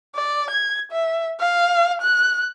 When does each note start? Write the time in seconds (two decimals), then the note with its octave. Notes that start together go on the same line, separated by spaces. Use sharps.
0.15 D5
0.50 G#6
0.91 E5
1.40 F5
2.01 F#6